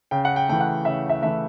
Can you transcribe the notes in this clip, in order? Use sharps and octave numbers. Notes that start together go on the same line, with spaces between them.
C#3 G5
F#5
G5
E3 A3 G5
F#5
C#3 E5
E5
E3 A3 E5